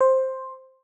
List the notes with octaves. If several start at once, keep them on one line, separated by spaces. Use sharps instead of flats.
C5